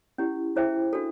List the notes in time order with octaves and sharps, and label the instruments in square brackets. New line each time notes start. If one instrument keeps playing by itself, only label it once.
[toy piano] C#4 E4 G4
E4 G#4 C5 E5 G5
D4 F#4 A4